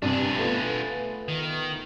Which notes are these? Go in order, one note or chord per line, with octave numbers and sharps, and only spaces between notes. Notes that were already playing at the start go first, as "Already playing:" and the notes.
G2 C3 D4 G#4
A3 B3 F4
D#3